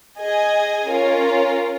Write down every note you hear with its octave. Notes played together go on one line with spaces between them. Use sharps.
G#4 D#5 G#5
C#4 F4 A#4